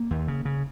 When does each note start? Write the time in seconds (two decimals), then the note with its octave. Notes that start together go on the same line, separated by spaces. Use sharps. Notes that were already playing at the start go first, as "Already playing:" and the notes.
Already playing: A#3
0.11 D#2
0.28 C#3
0.45 C#3